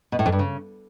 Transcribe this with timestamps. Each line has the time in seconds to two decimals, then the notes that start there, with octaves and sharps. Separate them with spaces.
0.12 B2
0.19 A2
0.26 F2
0.32 G2
0.39 C#3